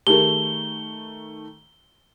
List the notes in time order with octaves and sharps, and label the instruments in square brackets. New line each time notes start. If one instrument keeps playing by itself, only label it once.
[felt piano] D#3 A3 [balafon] G4 G#4 A#4 [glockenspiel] G7